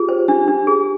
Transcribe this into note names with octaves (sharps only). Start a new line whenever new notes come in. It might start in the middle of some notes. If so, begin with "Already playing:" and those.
Already playing: F4 G4 G#4
C5
D4 G4
D4
G#4